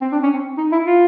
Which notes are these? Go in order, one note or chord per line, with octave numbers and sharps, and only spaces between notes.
C4
D4
C#4
C4
D#4
E4
F4